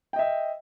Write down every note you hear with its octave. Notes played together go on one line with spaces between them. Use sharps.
D#5 E5 G5